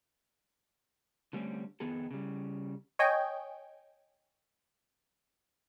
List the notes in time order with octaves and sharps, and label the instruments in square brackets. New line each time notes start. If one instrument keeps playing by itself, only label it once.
[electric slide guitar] D3 G3 A3 C4 C#4
F2 D#3 B3 G#4 A4
C#3 G3
[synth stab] C#5 D#5 G5 G#5